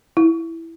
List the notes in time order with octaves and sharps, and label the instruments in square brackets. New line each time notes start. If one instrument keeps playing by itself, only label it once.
[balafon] E4